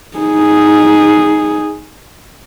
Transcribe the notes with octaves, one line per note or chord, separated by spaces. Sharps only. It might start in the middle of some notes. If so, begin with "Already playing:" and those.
D#4 G#4